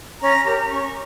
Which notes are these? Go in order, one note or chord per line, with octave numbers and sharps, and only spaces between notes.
C#4 A#5
G4 A#4 C#5 A#5
C#4 C#6